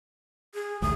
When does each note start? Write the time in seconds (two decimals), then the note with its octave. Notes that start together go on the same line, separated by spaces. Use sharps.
0.55 G#4
0.82 A1 D2 A2 D#6